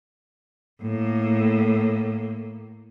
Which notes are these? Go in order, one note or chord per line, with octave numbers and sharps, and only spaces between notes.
A2 A#3